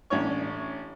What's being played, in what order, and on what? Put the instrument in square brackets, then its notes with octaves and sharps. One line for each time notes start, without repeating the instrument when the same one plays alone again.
[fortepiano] A1 C#4 D4 C#5 C#6